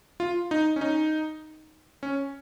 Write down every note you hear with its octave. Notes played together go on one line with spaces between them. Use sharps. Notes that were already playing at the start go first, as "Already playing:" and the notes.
F4
D#4
C#4
D#4
C#4